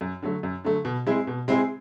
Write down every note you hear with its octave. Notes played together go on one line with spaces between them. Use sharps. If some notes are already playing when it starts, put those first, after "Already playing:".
F#2
D3 F#3 A3
F#2
D3 F#3 A3
B2
G#3 C4 E4 G#4
B2
G#3 C4 E4 G#4